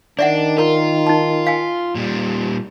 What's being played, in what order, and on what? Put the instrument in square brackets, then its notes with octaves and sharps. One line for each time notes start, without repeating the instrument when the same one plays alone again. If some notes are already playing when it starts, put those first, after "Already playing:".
[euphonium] D#3 [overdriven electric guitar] D4 [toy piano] D5 E5 F#5
[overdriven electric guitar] F4 [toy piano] A#4 A#5
[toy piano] D#4 A5
F5 G#5
[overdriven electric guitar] A#2 G3